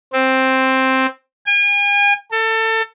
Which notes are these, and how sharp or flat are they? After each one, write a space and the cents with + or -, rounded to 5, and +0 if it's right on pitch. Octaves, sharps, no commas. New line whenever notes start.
C4 +5
G#5 -40
A4 +25